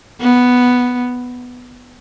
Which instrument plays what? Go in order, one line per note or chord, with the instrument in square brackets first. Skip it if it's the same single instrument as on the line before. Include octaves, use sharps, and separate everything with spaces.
[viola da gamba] B3